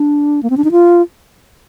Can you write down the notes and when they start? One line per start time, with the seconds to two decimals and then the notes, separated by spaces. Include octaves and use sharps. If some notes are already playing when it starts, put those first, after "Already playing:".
Already playing: D4
0.43 A#3
0.50 C4
0.57 D4
0.64 D#4
0.71 F4